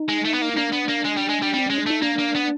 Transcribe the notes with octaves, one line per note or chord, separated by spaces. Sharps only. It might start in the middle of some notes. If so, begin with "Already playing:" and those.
Already playing: D#4
G#3
A3
B3
A#3
D#4
A#3 D4
B3
A#3
G#3
G3
G#3
G3
G3 C4
G#3 C#4
D4
A3 D#4
A#3 D4
A#3
B3